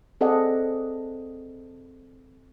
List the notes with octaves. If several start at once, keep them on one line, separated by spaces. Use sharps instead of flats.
C4 G#4 A4 D5 D#5 F#5